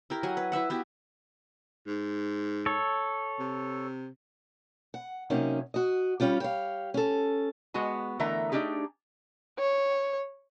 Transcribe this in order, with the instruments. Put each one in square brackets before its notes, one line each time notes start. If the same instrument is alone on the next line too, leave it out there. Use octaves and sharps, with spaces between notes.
[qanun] E4 G4 A#4
F#3 F#5 G#5
B4
E4 B4 E5 F#5
B3 E4 F#4 G4
[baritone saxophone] G#2
[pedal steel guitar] A4 C#5
[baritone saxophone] C3
[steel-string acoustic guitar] F#5
C3 F#3 A#3 C#4 D#4
F#4 D#5
G3 C#4 F4 G4
G4 C#5 F5
C#4 A4
[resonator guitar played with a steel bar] G#3 B3 F#4 G#5
D3 E3 A3 A#4 E5 A#5
A3 D4 D#4 G4 G#4
[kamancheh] C#5